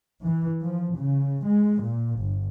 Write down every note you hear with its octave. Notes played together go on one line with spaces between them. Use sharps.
E3
F3
C#3
G#3
A#2
G1